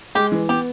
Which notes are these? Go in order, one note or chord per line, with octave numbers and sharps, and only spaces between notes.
G#3 G4
E3
B3 G4